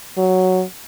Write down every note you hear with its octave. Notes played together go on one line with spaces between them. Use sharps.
F#3